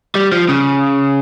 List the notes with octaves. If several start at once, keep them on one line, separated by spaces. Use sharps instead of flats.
G3
F3
C#3